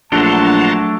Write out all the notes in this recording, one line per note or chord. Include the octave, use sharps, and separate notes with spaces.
A#1 F#3 A3 D4 F#5 A5 A#5 C6